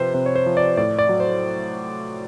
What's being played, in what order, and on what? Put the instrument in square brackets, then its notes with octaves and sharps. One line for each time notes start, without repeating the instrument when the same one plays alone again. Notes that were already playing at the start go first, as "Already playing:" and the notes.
Already playing: [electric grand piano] C3 F3 B4 C5
C3 C5
C#5
C5
F3
D5
A2 D5
D5
F#3
C5